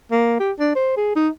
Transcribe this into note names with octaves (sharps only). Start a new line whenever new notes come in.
A#3
G4
D4
C5
G#4
D#4